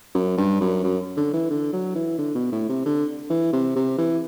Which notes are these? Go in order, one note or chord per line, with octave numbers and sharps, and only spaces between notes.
F#2
G2
F#2
F#2
D3
E3
D3
F#3
E3
D3
B2
A2
C3
D3
E3
C3
C3
E3